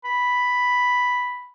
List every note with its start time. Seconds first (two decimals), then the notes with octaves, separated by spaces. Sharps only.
0.05 B5